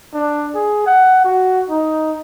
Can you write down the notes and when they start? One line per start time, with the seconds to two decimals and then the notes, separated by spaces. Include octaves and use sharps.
0.14 D4
0.55 G#4
0.87 F#5
1.24 F#4
1.70 D#4